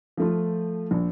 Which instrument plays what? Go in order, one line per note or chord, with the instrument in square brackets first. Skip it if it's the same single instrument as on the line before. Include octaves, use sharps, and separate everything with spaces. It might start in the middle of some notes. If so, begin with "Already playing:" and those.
[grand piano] F3 A3 F4
A#1